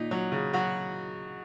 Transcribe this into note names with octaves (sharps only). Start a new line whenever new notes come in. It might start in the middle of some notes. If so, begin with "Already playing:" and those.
Already playing: A#2 D#4
F#3
C#3
F#3 F#4